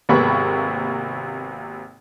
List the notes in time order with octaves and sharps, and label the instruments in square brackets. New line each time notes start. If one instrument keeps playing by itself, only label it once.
[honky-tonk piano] G#1 C3 A#3 B3 B5 C#6